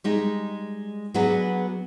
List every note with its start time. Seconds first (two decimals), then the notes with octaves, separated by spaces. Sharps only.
0.04 G3 G#3 D#4
1.14 F#3 B3 D4 G#4 B4